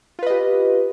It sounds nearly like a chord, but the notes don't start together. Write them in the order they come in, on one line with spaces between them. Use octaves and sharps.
F4 B4 D#5 G4